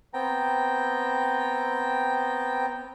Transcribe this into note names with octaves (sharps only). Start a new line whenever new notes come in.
B3 C4 G5 A#5